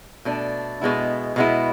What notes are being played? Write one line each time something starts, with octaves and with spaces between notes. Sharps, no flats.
B2 A3 D4
B2 G#3 B3 E4
B2 G#3 B3 E4